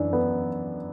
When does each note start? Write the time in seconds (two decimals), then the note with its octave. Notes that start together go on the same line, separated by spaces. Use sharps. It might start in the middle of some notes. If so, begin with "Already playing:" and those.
Already playing: F#2 E3 D4
0.13 B3